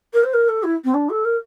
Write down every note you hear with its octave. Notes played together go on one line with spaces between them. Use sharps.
A#4
C5
A#4
A4
E4
C4
D4
A4
A#4